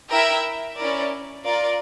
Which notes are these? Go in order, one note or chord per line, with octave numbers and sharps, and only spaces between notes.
E4 A#4 E5 G5
C#4 E4 A#4 D5
F4 A#4 D5